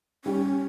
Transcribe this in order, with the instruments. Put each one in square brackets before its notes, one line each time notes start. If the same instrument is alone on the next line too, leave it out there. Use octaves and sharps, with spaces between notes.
[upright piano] G3 G4 [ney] C#4